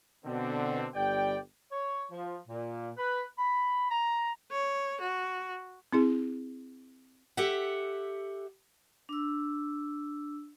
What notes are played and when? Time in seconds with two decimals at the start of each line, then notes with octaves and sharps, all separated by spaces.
0.25 B2 D3 C4
0.95 G1 G3 D5 G5
1.72 C#5
2.11 F3
2.49 A#2
2.98 B4
3.38 B5
3.90 A#5
4.51 C#5
5.00 F#4
5.92 C4 E4 G#4
7.37 G4 A4 E5 F#5
9.09 D4 E6